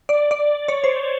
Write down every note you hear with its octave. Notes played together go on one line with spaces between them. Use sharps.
D5
D5
C#5
C5